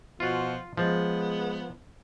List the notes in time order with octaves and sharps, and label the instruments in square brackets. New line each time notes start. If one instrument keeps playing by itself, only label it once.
[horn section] B2 F#4 [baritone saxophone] F3 [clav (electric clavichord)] F4
[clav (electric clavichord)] F3 [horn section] G#3 [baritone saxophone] B3